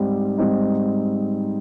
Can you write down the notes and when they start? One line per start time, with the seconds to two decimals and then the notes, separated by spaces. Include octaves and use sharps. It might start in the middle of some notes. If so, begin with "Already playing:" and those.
Already playing: G#2 G3 C4 D#4
0.38 G#2 G3 C4 D#4